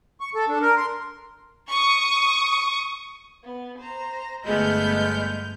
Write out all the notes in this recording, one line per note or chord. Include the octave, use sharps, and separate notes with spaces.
C#6
A4
D4
A#4
C6
C#6 D#6
B3
C5 A#5
G1 G#3 A3 B3 D#5 F6 G6